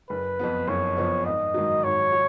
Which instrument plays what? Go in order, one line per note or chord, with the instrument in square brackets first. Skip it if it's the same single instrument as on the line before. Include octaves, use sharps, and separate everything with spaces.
[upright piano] F#1 [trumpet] B4
[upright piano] F2 F3 B3
[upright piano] F#1 [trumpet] C#5
[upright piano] F2 F3 B3
[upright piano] G#1 [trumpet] D#5
[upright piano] G#2 D#3 F#3
[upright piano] G#1 [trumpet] C#5
[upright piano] F#3